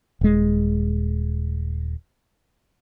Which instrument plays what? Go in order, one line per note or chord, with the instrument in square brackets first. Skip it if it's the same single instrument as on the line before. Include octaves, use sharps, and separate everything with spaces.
[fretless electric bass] D#1 G#3